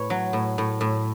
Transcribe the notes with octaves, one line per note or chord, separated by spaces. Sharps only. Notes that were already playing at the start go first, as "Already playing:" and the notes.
Already playing: A2 B4 C#5
F#3
A2
A2
A2